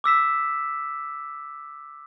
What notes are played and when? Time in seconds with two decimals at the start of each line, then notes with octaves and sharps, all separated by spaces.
0.04 D6 E6 B6 E7